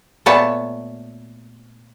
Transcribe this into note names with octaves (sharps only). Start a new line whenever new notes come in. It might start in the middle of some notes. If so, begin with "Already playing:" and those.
A#2 A3 B3 C#5 A5